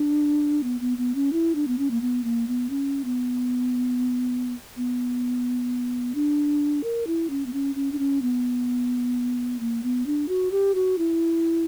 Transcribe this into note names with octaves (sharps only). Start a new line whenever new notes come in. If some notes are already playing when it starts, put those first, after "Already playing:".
Already playing: D4
B3
B3
B3
C#4
E4
D4
B3
C#4
A#3
B3
A#3
B3
C#4
B3
B3
D4
A#4
E4
C#4
B3
C#4
C#4
D4
C#4
B3
A#3
B3
D4
F#4
G4
F#4
E4